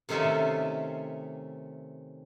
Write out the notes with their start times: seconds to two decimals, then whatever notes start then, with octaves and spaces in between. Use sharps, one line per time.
0.09 C3 D#3 A3 C#4 F4 E5